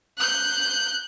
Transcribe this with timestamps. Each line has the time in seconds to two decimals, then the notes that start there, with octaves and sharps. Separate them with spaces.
0.18 F#6 G6